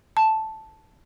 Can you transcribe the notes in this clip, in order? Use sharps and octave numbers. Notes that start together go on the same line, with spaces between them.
A5